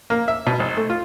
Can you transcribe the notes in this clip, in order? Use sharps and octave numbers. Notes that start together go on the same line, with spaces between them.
A#3
E5
B2
G#1
A3
F4